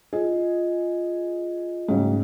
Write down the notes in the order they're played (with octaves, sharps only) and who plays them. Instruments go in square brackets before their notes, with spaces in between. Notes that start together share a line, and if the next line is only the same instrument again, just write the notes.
[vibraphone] F4 D#5 [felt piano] G#4
[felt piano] G#2 C#3 [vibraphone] G3 A3 F#4